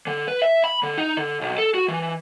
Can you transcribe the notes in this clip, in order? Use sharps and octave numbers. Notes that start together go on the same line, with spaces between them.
D3
B4
E5
B5
D3
D#4
D3
B1
A4
F#4
E3